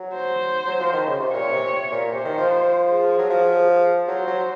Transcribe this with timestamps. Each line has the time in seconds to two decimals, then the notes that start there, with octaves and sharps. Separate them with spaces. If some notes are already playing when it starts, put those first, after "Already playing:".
Already playing: F#3
0.15 C5
0.67 F#3
0.80 F3
0.93 D#3
1.07 C#3
1.19 C3
1.32 A#2 C#5
1.52 C3
1.92 A#2
2.12 C3 C5
2.25 D#3
2.38 F3
2.90 G#4
3.19 F#3
3.30 F3
4.08 F#3 C5
4.28 F#3